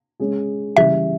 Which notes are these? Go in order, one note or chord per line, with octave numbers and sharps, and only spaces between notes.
G#3 C#4 G#4
C#3 E3 G3 E5